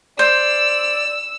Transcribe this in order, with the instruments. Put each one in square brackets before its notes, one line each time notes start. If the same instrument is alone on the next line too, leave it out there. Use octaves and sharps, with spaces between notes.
[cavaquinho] C5 [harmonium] D5 [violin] E6